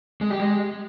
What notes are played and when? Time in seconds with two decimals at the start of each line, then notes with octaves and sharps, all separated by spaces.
0.21 G#3
0.30 G4
0.40 G#3